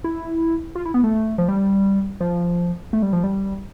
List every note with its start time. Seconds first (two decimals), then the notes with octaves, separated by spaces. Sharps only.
0.04 E4
0.75 F4
0.85 E4
0.94 B3
1.04 A3
1.38 F3
1.48 G3
2.21 F3
2.93 A3
3.02 G3
3.13 F3
3.24 G3